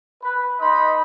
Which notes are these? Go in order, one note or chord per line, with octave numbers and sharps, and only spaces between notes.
B4
D#4 D#5 B5 C6